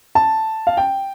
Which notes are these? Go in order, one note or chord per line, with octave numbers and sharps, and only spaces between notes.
A5
F5
G5